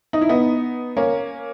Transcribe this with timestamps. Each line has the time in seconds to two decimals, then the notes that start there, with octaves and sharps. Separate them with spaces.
0.13 D#4
0.21 E4
0.29 B3 D#4
0.97 A#3 C#4